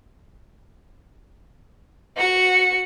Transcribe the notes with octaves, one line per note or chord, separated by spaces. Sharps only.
F#4 C#7